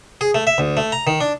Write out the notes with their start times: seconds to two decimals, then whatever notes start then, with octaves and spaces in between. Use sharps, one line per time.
0.21 G#4
0.35 A3
0.47 E5
0.58 D2
0.77 A3
0.92 A#5
1.07 D#3
1.21 D4